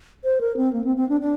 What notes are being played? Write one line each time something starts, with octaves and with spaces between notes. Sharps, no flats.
C5
A#4
C4
A#3
C4
C4
D4
D4